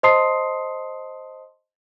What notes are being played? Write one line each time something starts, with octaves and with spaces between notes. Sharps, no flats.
C5 D#5 A5 C6 D#6 C7